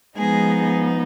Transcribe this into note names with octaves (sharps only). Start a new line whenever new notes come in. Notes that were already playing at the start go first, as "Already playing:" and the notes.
F3 G#3 B3 D#4 G#4